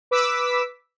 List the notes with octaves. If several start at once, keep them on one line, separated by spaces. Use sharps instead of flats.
B4 D6 E6 B6